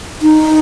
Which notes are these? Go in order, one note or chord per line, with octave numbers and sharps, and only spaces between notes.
D#4